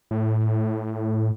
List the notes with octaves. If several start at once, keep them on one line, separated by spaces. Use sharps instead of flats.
A2